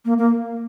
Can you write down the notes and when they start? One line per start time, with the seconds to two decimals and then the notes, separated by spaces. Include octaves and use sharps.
0.05 A#3
0.18 A#3